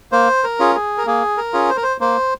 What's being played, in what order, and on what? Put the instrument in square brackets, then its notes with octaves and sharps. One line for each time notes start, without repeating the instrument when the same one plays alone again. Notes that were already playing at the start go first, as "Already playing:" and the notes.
[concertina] A#3 C5
A#4
C#4 F4 G#4
G#4
A#4
A#3 G#4
A#4
C#4 F4 G#4
C5
A#4
C5
A#3 C5